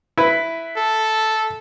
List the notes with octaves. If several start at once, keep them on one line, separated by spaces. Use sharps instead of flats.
E4 B4
A4